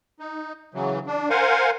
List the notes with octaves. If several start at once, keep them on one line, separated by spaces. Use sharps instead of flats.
D#4
C#3 E3 F#3
D4
A#4 C5 F5 F#5 G#5